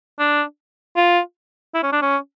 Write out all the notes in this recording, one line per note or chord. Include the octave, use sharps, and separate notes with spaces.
D4
F4
E4
C#4
D4
C#4